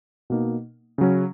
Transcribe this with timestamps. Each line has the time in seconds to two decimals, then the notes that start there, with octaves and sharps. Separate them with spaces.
0.30 B2 A#3 D#4
0.98 C#3 F#3 C#4